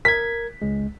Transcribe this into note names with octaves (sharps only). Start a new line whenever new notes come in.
A#4 G#6 B6
C#2 G#3